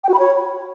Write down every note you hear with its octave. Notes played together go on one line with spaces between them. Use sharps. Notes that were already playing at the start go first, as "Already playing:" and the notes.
G5
F#4
B5
C#5